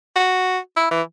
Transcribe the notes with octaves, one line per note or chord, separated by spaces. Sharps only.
F#4
E4
E3